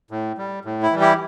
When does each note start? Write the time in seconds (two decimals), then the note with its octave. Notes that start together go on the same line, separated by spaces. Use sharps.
0.11 A2
0.38 G3
0.65 A2
0.83 E4
0.92 E3 G3
1.01 E4 G4